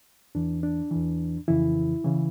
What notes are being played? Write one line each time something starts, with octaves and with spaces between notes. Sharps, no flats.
E2 E3 D4
D4
E2 E3
F2 C#3 E3 E4
C#3 E3